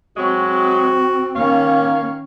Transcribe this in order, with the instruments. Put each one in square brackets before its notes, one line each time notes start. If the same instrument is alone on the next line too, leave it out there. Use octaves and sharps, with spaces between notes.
[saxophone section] F#3 G#3 [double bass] C4 [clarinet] F#4
[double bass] D#3 C#4 [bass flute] A#3 [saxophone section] C#5 F5